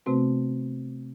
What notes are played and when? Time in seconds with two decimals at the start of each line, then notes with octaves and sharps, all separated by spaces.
0.06 C3 A3 B3 C4 F#4 B4